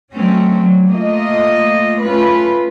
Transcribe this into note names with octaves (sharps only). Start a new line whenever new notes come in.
F#3 A3 C4 C#4
F#3
A3 A#3 F4 D#5
A3 C#4 F4 B4